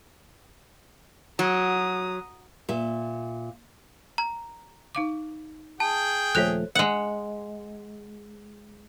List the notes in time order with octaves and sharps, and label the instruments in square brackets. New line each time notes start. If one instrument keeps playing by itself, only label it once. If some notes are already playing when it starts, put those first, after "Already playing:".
[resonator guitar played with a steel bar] F#3 [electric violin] A#5 D#6
[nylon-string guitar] A#2 E5
[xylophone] A#5
[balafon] D#4 F5 D6
[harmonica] G#4 G5 [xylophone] A5
[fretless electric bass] D#1 F3 A3 [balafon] A4 C5 C#5 [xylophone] F#6 F7
[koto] G#3 F#5